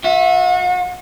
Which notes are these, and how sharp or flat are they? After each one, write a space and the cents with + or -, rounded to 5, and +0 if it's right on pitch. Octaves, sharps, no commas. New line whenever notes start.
F#4 -40 E5 +0